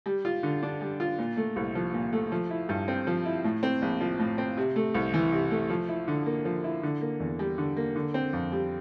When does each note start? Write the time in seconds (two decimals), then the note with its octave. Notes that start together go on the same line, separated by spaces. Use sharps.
0.06 G3
0.25 F4
0.43 D3
0.63 D4
0.81 G3
1.00 F4
1.19 A#2
1.37 A3
1.56 C2
1.75 F3
1.94 A#2
2.13 A3
2.32 F3
2.50 E4
2.69 G2
2.88 C4
3.07 F3
3.26 E4
3.44 A2
3.63 C4
3.82 A#1
4.01 F3
4.19 A2
4.38 C4
4.57 C3
4.76 A3
4.94 C2
5.14 E3
5.32 C3
5.51 A3
5.70 F3
5.89 E4
6.08 D3
6.26 A#3
6.45 F3
6.64 E4
6.83 D3
7.01 A#3
7.20 E2
7.39 G3
7.58 D3
7.77 A#3
7.96 D3
8.14 C4
8.33 F2
8.52 G3